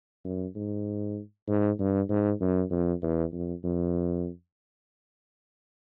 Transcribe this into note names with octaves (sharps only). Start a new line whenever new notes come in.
F#2
G#2
G#2
G2
G#2
F#2
F2
E2
F2
F2